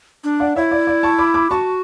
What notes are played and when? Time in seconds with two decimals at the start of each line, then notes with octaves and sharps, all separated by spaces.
0.24 D4
0.40 D5 F#5
0.56 E4 C#5 E5
0.72 D5
0.87 D5
1.03 A5 C#6
1.18 B5 D6
1.34 B5 D6
1.50 F#4 A5 C#6